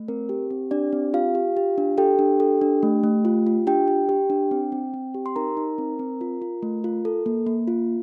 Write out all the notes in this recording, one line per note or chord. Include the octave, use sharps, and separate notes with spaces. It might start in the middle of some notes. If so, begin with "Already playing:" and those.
Already playing: A3
C4 A#4
G4
C4
D4 G4 D5
C4
F4 G4 F5
G4
G4
D4
G4 A4 G5
D4
A4
D4
A3
A3
F4
F4
D4 G4 G5
G4
G4
D4
C4
C4
C4
G4
C6
D#4 A#4 A#5
D#4
C4
C4
F4
F4
A3
F4
A4
A#3
A#3
F4